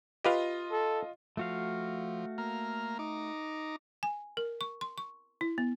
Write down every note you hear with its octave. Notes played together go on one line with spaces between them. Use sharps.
F4 G4 B4 D#5 F5
A4
F3 A3 F#4 F5
A#3 A#5 F6
D#4 A#5 D6
G#5
A#4
C#6
C6
C#6
E4
B3